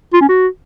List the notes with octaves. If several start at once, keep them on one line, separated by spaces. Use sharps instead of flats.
F4
C#4
F#4